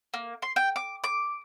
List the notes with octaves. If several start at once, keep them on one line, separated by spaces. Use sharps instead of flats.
A#3
C6
G5
D6
D6